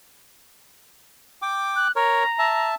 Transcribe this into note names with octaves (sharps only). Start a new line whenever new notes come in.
G5 D6
F#6
A#4 C#5 A#5
E5 A5